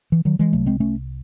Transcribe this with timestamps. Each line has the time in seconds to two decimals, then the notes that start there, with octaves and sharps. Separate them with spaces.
0.12 E3
0.25 D#3 F#3
0.39 E3 G#3
0.52 C2 C3 F#3 A3
0.66 G#3 C4
0.80 A3 C#4